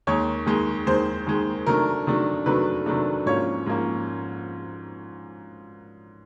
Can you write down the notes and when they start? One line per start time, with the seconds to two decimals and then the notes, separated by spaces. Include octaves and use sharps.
0.07 D#2 D#3 G#3 C#5
0.46 D#2 D#3 G#3
0.87 D#2 D#3 G#3 C5
1.27 D#2 D#3 G#3
1.66 C3 D#3 F#3 A3 D4 A#4
2.07 C3 D#3 F#3 A3 D4
2.46 C3 D#3 F#3 A3 D4 B4
2.86 C3 D#3 F#3 A3 D4
3.26 G#2 F3 A#3 C#4 C#5
3.66 G#2 F3 A#3 C#4